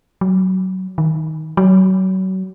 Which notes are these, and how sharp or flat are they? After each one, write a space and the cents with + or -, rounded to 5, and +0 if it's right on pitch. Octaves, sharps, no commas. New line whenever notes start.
F#3 +20
D#3 +15
F#3 +30